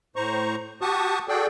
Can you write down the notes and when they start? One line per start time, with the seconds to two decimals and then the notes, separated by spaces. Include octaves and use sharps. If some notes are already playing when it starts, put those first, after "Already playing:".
0.16 A2 C5 A#5 C#6
0.81 F#4 G4 A5 C#6 D#6
1.29 F#4 G#4 A4 D5 G5